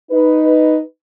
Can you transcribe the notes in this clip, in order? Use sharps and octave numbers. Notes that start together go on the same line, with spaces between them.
D#4 B4